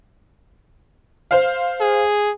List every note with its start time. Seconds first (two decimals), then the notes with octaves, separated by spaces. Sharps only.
1.31 C5 F5
1.81 G#4